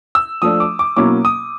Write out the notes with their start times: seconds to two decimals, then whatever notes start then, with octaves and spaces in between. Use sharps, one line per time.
0.15 E6
0.42 F3 A3 D4 D#6
0.60 D6
0.79 D6
0.96 B2 F#3 A#3 C#4 E4 D6
1.25 D#6